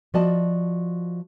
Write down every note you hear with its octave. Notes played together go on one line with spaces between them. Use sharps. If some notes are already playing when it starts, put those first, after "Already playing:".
F3 F#4 D5 D#5 A5